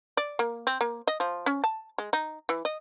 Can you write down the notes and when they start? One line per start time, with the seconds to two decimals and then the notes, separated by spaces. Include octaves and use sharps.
0.17 D5
0.39 A#3
0.67 C4
0.81 A#3
1.07 D#5
1.20 F3
1.46 C#4
1.64 A5
1.98 G#3
2.13 D#4
2.49 E3
2.65 D#5